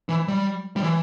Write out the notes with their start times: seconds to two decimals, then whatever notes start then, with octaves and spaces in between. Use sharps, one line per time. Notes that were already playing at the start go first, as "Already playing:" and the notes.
0.09 E3
0.28 G3
0.76 G3
0.83 E3